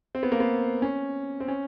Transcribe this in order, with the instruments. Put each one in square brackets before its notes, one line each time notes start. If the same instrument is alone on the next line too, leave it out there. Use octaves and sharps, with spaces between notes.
[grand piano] C4
B3
A#3
B3
C#4
C4
C#4